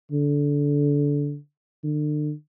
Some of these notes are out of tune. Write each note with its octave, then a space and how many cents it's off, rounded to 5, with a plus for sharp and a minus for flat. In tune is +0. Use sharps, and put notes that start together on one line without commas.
D3 -20
D3 +35